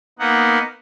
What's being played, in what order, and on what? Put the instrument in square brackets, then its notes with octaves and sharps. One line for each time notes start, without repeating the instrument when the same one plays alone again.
[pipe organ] A#3 B3 D#4 F#5